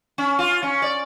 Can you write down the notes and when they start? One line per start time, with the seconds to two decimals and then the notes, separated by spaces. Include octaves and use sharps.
0.18 C#4
0.39 F4
0.63 C#4
0.82 D5